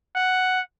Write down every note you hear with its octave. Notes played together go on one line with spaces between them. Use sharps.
F#5